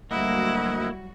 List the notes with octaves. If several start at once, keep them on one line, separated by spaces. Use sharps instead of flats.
D2 F#3 G3 A#3 E4 F#4 D#5 F#5